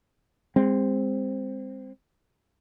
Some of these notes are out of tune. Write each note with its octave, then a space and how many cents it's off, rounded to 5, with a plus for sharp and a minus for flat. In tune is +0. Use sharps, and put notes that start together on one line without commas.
G#3 -35 C4 +0